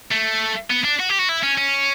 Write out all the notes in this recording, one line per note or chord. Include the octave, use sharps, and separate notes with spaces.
A3
B3
D4
F#4
G4
F#4
E4
C#4
C#4